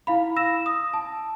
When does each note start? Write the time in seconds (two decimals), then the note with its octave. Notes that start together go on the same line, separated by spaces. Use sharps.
0.07 E4 F5 B5
0.36 E6 A#6 E7
0.66 D#6
0.94 A5